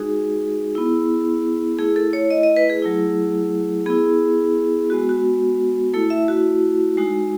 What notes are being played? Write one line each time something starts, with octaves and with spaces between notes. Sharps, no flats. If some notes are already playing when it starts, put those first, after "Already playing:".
Already playing: G#3 D#4 F#4 G#4
B3 E4
A3 E4 G#4
A4
C#5
D#5
D#5
B4
G#4
F#3 A3 E4
B3 E4 G#4
G#3 B3 F#4
F#4
A3 E4 A4
E5
F#4
G#3 D#4 F#4